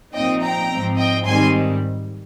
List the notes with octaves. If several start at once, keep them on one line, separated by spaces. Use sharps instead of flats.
A#2 F3 C4 D#4 D#5 G5
G5 A#5
G#2 F3 C4
D#5 G5
G#2 D#3 G3 C4 G#5 C6